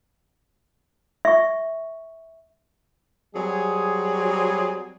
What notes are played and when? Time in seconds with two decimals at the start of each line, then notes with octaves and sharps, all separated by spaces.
1.25 E5 C#6
3.36 F#3 G3 C4 G#4